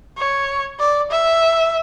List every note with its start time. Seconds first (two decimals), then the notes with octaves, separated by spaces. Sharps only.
0.18 C#5
0.79 D5
1.11 E5